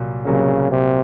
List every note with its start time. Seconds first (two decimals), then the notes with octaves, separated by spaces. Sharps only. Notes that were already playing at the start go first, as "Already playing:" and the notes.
Already playing: C2 A#2 F#3 A#3
0.25 C2 A#2 C#3 F#3 A#3
0.71 C3